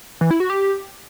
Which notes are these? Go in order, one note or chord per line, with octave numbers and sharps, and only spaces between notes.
E3
E4
F#4
G4